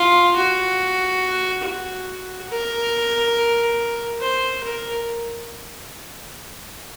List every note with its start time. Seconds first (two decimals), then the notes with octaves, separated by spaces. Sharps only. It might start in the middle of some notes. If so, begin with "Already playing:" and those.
Already playing: F4
0.36 F#4
1.63 F#4
2.49 A#4
4.20 C5
4.63 A#4